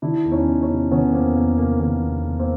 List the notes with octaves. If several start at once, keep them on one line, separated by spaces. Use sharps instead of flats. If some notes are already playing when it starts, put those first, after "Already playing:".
D#3 D4 E4
E2
C#4 D#4
E2
C#4 D#4
C3
D#3 B3 C#4
E2 A#3 C4
E2 A#3
C3 A#3
D#3 A#3
E2
E2
A#3 C4